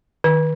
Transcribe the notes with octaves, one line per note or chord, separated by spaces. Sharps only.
D#3